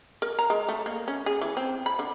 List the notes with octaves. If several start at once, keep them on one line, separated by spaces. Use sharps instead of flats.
A#4
A#5
G#3
A3
A#3
C#4
G#4
E3
C4
B5
D3